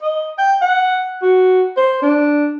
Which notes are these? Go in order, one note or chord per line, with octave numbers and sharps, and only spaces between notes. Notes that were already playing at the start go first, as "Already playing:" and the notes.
D#5
G5
F#5
F#4
C5
D4